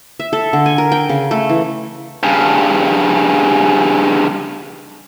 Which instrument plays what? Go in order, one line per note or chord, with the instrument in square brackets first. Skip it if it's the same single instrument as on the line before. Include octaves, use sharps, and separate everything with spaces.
[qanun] E5
A4
D3
G#5
A#4
G5
C#3
A3
E3
[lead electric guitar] G2 C#3